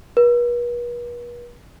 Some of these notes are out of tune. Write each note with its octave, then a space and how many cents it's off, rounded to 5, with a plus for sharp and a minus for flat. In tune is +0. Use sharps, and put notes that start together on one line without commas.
B4 -45